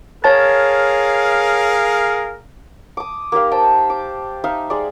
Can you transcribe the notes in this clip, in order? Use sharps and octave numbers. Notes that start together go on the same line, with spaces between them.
G#4 A#4 C#5 F5 A5 A6
D6 D#6
A#3 D#4 G4 F5
C5 G5 A5
D6
D#4 E5 F5
G#3 D5